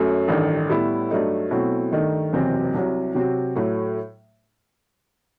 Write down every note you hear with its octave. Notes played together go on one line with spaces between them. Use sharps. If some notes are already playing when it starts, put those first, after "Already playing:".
Already playing: F#2 F#3 A3
A1 G2 D#3 A3
A2 G3 B3 E4
G2 F#3 A3 D#4
B2 F#3 A3 C4 E4
G2 D#3 A3 D#4
F#1 E2 C3 F#3 C4
C2 C3 F#3
C3 F#3 C4 F#4
A2 F#3 A3